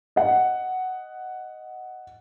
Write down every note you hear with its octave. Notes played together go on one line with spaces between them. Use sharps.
D#5 F#5